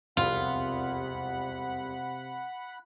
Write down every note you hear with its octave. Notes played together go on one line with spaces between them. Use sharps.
E1 C2 F2 C3 F4 F#5 B5